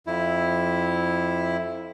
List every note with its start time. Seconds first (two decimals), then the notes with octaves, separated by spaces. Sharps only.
0.07 F2 E4